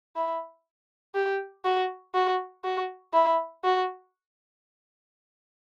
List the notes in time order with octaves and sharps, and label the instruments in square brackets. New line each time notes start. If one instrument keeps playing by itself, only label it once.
[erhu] E4
G4
F#4
F#4
F#4
E4
F#4